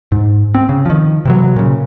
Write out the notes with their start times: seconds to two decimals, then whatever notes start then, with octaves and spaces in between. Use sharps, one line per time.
0.12 G#2
0.55 C4
0.69 C#3
0.86 D#3 F3
1.25 C3 E3 F#3
1.56 A#2 C#3